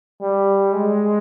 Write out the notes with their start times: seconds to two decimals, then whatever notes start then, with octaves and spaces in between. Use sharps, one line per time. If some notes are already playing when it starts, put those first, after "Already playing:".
0.22 G3
0.73 G#3